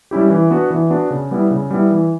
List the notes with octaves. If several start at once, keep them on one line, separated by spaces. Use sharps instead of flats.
G3 C#4 E4 G4
E3
B3 D4 F#4
E3
B3 D4 F#4
C#3
G3 B3 E4
C#3
G3 B3 E4
E3